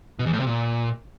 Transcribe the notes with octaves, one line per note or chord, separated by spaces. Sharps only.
B2
E2
A2
C3
A#2